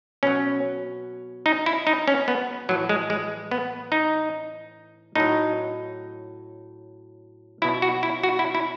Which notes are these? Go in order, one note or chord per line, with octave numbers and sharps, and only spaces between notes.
B2 F#3 C#4
D#4
E4
D#4
C#4
B3
A2 E3 F#3
G#3
G#3
B3
D#4
A2 F#3 D#4
B2 F#3 E4
F#4
E4
F#4
E4
E4